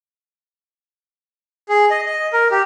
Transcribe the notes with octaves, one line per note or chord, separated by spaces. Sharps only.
G#4
D#5
D#5
A#4
G4